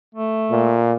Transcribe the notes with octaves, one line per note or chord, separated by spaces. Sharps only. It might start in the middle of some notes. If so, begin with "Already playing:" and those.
A3
A#2